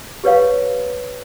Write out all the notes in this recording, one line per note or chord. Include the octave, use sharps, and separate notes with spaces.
G4 B4 C#5 F5